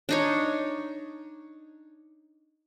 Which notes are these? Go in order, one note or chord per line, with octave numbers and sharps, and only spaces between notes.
D4 D#4 C#5